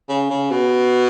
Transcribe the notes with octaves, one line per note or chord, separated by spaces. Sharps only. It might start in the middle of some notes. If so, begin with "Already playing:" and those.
C#3
C#3
B2